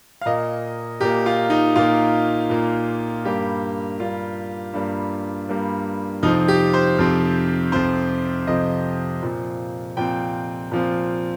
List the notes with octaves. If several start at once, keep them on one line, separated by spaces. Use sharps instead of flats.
F5
A#2 A#3 D#5
A#2 A#3 G4
F4
D#4
A#2 A#3 F4
A#2 A#3
G2 G3 A#3 G4
G2 G3 A#3 F4
G2 G3 A#3
G2 G3 A#3
F2 C3 F3 C4 D#4
G4
C5
F2 C3 F3 C4
F2 C3 F3 C4 C5
F2 C3 F3 C4 D#5
A#2 F3 C4
A#2 F3 C4 G5
A#2 F3 C4